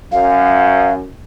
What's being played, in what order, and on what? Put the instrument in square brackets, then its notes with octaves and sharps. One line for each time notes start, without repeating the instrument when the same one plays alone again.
[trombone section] F#2 [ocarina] F5